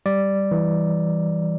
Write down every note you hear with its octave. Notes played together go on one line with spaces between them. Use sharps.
G3 D5
E3